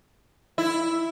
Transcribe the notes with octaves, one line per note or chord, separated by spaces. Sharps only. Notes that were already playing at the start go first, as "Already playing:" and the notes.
E4